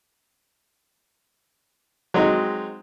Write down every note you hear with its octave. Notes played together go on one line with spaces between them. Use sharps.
F#3 G#3 C4 D#4